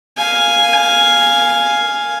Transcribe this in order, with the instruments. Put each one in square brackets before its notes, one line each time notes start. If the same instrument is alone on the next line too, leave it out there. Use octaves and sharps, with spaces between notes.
[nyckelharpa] F5 G#5